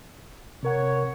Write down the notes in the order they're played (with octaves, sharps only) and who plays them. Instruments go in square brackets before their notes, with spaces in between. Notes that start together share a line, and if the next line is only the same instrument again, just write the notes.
[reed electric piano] C3 A#4 F#5 [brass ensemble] C#5